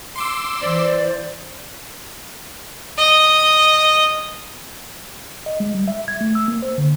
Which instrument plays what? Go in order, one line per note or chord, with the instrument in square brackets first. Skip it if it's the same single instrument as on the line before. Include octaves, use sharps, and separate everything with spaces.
[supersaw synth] C6 D6 E6
[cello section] E3 [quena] C5 [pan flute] D5
[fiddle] D#5
[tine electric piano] D#5
G#3
G3
E5
G#6
A3
E6
A#3
C5
D3